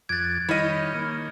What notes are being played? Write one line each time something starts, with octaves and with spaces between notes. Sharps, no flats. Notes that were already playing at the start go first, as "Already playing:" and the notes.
F2 D6 F#6 G#6 A6
D#3 G3 E4 C#5 D#5 F6
D#3 A#3